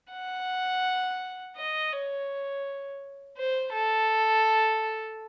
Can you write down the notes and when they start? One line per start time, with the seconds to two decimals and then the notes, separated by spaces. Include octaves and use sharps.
0.12 F#5
1.57 D#5
1.93 C#5
3.38 C5
3.73 A4